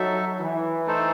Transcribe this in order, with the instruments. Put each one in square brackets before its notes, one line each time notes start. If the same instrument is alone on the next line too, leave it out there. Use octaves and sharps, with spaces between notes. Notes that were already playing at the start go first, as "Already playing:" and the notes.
Already playing: [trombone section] F#3 [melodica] D#4 A4 E5
[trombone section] E3
[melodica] A3 D#4 A4 C5